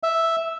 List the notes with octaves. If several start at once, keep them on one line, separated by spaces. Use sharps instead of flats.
E5